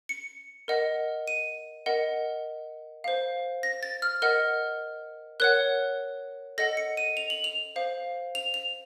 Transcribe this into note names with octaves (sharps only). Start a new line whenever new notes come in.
C#7
A#4 D#5 F#5
D#7
A#4 D#5 F#5
C5 F5
A#6
A6
F6
A#4 D#5 F#5 F6
A#4 C#5 F#5 F#6
A4 D#5 F#5 A#6
C#7
D#7
F7
F#7
F7
C5 F5
F7
F7